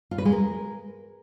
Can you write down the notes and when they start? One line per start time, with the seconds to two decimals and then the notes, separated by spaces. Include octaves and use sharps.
0.11 F4
0.18 B4
0.25 G#3
0.32 A#4